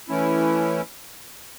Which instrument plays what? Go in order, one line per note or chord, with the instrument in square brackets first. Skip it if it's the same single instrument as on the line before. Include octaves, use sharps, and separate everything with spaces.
[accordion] E3 A3 C#4 E4